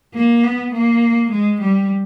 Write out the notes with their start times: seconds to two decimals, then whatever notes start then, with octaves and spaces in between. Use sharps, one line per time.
0.14 A#3
0.43 B3
0.73 A#3
1.31 G#3
1.61 G3